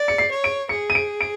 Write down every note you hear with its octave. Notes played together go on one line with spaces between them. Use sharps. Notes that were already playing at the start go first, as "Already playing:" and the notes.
Already playing: D5
C#7
C7
C#5
D7
G#4 C#7
D#7
D7
D7